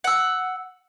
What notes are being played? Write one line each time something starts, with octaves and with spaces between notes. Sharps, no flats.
F#5 E6